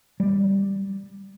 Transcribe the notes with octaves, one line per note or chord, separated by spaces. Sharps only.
G3